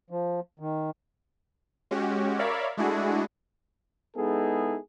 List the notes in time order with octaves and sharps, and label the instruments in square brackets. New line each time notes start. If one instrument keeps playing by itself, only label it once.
[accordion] F3
D#3
[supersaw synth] G#3 C#4 F#4 G4
A#4 C#5 D5 E5 F5 B5
G#3 A3 D4 E4 F#4 G#4
[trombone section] G#3 B3 D#4 E4 G#4 A4